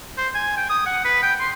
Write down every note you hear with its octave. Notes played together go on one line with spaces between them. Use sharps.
C5
G#5
G5
D#6
F#5
B4
G5
C6